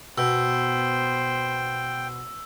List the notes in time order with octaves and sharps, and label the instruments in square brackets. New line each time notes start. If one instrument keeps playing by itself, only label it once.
[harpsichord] B2 [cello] B3 C5 [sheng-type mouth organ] G5 [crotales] E6